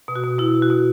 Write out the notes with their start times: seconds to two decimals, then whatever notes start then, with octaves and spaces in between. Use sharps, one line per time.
0.08 B2
0.16 F#4
0.24 B2
0.39 B2 E4
0.55 B2
0.62 F#4
0.70 B2